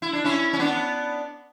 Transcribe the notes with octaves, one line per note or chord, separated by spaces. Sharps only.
E4
D4
C#4 E4
C#4
B3 D4